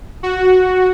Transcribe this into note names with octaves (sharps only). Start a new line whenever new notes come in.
F#4